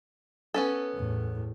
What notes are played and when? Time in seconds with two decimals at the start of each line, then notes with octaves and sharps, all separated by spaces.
0.54 B3 C#4 A4
0.95 E2 A2